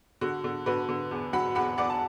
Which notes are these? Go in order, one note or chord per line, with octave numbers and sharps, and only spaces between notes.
D3 F#4
D3
D3 F#4 B4
D3
E2
F#3 F#5 B5
E2 F#5 B5
E2 D5 F#5
A5